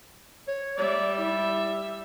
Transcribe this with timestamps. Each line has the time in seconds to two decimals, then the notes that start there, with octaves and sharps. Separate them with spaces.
0.48 C#5
0.77 G3 D5 E5
1.18 E4